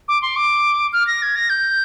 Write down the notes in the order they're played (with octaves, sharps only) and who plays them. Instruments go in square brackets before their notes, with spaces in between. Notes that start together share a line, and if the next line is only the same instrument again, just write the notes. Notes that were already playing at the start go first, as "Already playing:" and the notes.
[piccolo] D6
C6
D6
F6
A#6
G#6
A#6
G6